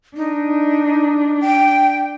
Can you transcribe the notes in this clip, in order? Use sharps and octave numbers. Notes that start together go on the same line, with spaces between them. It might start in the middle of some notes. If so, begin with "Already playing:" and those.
D4 D#4
G5